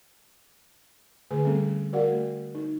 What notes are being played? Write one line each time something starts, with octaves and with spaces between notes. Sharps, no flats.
D3 A3 G#4 B4 G#5
G3 A3 C4 C#4 A4
F#4 A#4 D5 F5 F#5
A3
D#4